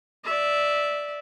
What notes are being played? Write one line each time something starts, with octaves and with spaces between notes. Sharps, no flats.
D5 E5